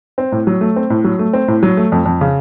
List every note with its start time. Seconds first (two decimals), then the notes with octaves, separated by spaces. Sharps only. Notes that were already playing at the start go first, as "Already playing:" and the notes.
0.18 C4
0.32 A2
0.47 F#3
0.61 A3
0.76 C4
0.90 A2
1.04 F#3
1.19 A3
1.33 C4
1.48 A2
1.63 F#3
1.77 A3
1.92 F2
2.06 F2
2.21 C#3